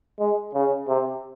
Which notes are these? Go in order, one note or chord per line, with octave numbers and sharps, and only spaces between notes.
G#3
C#3
C3